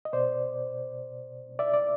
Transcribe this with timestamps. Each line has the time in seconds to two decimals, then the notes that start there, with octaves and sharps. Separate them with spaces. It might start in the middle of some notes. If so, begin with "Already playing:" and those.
0.05 D#5
0.13 B2 C5 D5
1.59 D5 E5
1.74 D5